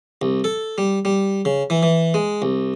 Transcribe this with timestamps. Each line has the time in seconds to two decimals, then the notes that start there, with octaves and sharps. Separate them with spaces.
0.22 C2
0.44 A4
0.78 G3
1.05 G3
1.45 C#3
1.70 E3
1.83 E3
2.14 G#3
2.42 C2